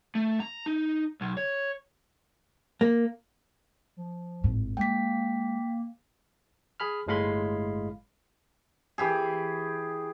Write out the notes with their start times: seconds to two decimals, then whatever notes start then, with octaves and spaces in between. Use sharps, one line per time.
0.15 A3
0.40 A#5
0.66 D#4
1.21 B1
1.37 C#5
2.81 A#3
3.97 F3
4.44 G#1 A2
4.77 G#3 A#3 G5 B6
6.80 G#4 B5 F6
7.07 G1 A2 G#3 F5 B5 C6
8.98 E3 G4 G#4